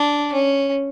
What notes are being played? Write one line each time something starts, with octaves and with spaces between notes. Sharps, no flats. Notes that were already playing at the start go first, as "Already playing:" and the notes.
Already playing: D4
C#4